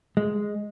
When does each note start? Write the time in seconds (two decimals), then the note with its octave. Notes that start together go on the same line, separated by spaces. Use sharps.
0.17 G#3